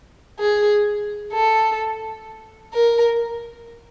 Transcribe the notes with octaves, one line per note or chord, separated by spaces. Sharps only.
G#4
A4
A#4